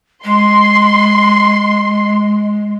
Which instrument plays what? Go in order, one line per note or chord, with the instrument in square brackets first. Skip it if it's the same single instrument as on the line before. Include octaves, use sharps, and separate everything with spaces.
[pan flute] G#3 [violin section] C6